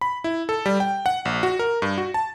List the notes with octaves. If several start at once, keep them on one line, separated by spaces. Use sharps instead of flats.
B5
E4
A4
G3
G5
F#5
A#1
F#4
A#4
G2
F#4
A5